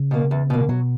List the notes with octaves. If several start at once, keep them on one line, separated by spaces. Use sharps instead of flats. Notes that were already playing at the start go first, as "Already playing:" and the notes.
Already playing: C#3
B2 A#3
E2
B2 A#3
C#3
B2 F#3